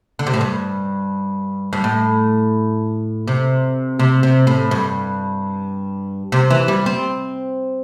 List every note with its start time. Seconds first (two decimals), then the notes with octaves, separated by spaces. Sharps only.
0.19 D3
0.27 C3
0.34 A2
0.41 G2
1.73 G2
1.84 A2
3.28 C3
3.99 C3
4.23 C3
4.47 A2
4.71 G2
6.32 C3
6.50 E3
6.68 G3
6.86 C4